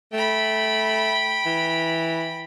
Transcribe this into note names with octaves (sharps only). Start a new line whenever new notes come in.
A3 G5 B5
E3